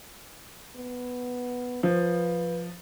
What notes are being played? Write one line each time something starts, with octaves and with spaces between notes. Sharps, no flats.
B3
F3 B4